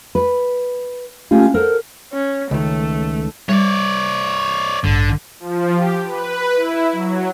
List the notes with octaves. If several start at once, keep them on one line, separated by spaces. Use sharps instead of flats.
B4
A3 C#4 F4 G4
A4 A#4 C5 F#5
C#4
C#2 D#3 A3
G3 C#5 D5
A1 G2 D3
F3
G4
B4
E4
F#3